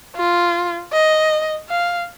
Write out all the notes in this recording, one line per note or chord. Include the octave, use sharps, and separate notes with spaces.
F4
D#5
F5